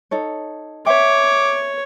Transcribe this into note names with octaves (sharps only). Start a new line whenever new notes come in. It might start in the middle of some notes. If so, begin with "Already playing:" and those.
D#4 A4 C#5
C#5 E5 G5 D6